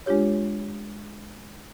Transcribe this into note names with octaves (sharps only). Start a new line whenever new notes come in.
G#3 D4 F4 G4 C#5